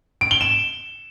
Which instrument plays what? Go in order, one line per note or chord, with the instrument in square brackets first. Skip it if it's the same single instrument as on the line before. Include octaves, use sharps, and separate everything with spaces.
[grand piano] D7
G7
E7